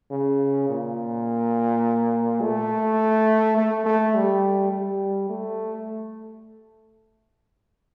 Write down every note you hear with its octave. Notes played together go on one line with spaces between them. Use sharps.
C#3
A#2
A3
A3
A3
G3
G3
A3